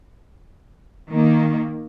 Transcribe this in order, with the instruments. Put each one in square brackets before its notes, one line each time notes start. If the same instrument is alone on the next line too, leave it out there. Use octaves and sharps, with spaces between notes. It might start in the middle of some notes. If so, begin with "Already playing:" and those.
[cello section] D#3 A#3